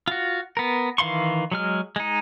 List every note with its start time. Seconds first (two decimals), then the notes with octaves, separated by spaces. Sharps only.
0.08 F4 F#4
0.57 B3 A#4
0.98 D#3 E3 F5 C6 C#6
1.52 F#3 G#3 F6
1.96 G#3 D#4